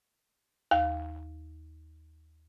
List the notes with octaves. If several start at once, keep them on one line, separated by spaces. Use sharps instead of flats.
D#2 F5